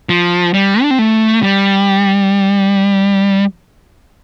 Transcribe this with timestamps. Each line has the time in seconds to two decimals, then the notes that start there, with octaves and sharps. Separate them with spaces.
0.09 F3
0.54 G3
0.82 D4
0.91 C4
0.99 A3
1.43 G3